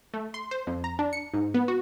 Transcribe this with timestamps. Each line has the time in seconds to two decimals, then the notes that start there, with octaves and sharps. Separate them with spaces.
0.14 A3
0.34 C6
0.51 C5
0.67 F2
0.84 A#5
0.99 D4
1.13 C#7
1.34 G#2
1.54 B3
1.68 F#4